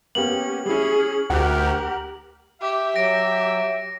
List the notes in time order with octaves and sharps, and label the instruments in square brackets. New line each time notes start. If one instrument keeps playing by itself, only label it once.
[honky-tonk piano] A#3 B3 G4 [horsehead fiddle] C#4 [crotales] F#7
[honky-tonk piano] G3 E4 [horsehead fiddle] C#4 G#4
[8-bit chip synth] D2 [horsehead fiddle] G4 A#4 [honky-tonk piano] F#5 F#6
[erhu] G4 [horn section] E5
[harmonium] F#3 [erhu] G4 [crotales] A#6 D7